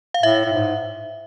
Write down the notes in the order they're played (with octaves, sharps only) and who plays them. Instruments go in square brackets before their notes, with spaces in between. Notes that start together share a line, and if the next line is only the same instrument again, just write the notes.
[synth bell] F5
[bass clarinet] A2 [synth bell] E5
[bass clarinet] A2
G#2